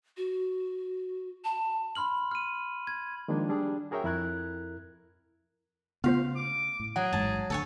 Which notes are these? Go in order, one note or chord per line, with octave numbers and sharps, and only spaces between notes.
F#4
A5
B5 C6 F6 F#7
F6 D#7
G#6
D#3 F3 G#3 A#3 D4 F4
G3 D4 G#4
F#4 G#4 A#4 C#5 E5 G5
F2 E4 A#4 F#6 G#6
C#3 A3 B3 F4 C5 F5
D6
A2
F#3 G#4 F#5
A1 G#2 A5
D2 A4 C#5 G#5